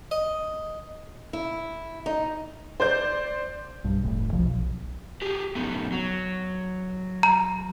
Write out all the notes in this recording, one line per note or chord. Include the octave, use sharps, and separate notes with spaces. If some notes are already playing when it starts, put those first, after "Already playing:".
D#5
E4
D#4
C5 D5 G6
B1 G2
F1 A2
B1 B2 F3
B1
G4 G#4
A3 B3 D#4
F#3
A#5